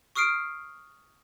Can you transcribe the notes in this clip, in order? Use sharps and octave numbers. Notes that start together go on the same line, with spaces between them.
C#6 D#6 F6 C7 D7